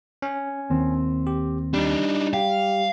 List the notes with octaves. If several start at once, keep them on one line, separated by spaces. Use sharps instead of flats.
C#4
D#2 C4
G4
G3 D4 D#4
G4 F5